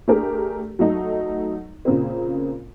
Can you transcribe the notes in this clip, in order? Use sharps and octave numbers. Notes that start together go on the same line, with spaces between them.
A3 D4 G4 G#4 A#4
F#3 A3 D#4
A#2 C#3 A#3 C4